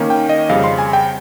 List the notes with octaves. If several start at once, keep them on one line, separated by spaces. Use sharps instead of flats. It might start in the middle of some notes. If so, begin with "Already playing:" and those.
Already playing: D#3 A#3 C#4
G5
D#5
F2 C#3 G3 F5
C6
G#5
G5